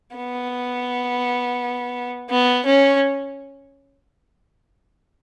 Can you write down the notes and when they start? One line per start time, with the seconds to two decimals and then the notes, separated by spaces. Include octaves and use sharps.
0.16 B3
2.30 B3
2.66 C#4